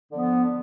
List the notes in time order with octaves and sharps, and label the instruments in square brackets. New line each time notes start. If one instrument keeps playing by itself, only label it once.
[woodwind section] D3 F3 B3